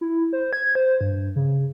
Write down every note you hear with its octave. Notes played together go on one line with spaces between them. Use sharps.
E4
C5
G#6
C5
G2
C#3